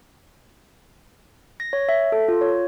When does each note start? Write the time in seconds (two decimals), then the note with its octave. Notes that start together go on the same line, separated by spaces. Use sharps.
1.60 A#6
1.73 C#5
1.89 E5
2.12 A4
2.28 F4
2.41 C#5